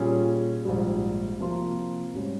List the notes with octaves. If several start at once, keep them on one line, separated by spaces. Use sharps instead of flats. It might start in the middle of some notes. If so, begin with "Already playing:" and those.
Already playing: A#2 G3 C#4 G#4
A#1 G#2 G3
C3 F3 A#3 F4
G#2 G3 C#4